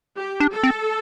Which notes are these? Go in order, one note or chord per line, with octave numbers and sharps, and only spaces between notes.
G4
D4
A4
C4